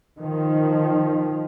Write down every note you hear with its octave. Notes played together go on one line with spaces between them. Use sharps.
D#3 F3